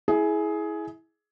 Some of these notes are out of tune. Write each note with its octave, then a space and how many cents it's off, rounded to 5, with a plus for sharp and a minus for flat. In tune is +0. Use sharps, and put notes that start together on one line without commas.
E4 -15 G#4 +15